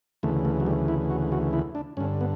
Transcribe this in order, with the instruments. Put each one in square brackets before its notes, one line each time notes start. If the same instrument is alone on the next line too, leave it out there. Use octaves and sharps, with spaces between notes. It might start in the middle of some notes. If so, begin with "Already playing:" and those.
[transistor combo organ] D2 C#3 E3 A3
A3
F#3
G3
E4
F#4
F#4
E4
D4
G2 D3 C#4
B3